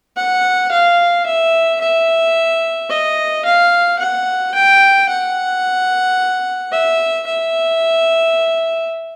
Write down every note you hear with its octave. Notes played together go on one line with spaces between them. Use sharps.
F#5
F5
E5
E5
D#5
F5
F#5
G5
F#5
E5
E5